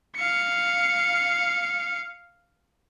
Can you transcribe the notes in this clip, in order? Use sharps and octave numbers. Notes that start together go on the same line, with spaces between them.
F5 C#7